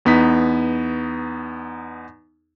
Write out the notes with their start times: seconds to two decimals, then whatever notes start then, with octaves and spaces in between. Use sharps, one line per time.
0.05 E2 B3 D#4 B6